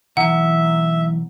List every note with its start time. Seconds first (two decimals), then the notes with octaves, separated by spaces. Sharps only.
0.17 B1 E3 E5 F#5 A#5